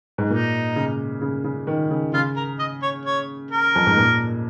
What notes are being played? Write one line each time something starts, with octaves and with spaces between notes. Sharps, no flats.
G#2
A#2 D#4
C#3
C#3
C#3
D#3
C#3
C#3 F4
A#4
D#5
C#5
C#5
A#4
F2
G#2
A#2